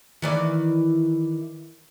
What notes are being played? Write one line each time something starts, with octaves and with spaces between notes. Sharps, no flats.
D#3 E3 D5